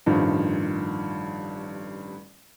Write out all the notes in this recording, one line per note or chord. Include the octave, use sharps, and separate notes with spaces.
A1 G2 D#3 F3